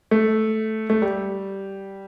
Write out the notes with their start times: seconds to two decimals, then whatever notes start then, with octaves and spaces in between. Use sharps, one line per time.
0.11 A3
0.90 A3
1.02 G3